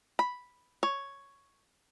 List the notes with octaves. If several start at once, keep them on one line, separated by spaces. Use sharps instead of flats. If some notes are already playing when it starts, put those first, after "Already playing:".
B5
C#5